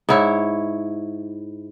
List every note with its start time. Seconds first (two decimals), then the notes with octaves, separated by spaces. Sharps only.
0.09 G#2 E4 C#5